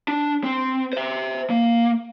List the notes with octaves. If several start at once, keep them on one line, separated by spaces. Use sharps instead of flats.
D4
C4
C5 E5
A#3